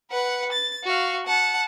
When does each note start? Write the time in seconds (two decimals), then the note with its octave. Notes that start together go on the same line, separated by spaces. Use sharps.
0.11 B4 F#5
0.52 A6
0.84 F#4 F5
1.27 F#5 A5